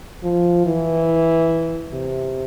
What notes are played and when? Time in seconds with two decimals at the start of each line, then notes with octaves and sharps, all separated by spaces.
0.24 F3
0.66 E3
1.93 C3